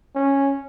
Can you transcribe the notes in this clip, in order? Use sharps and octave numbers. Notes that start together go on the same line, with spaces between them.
C#4